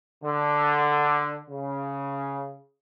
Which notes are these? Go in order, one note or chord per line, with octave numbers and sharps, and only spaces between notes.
D3
C#3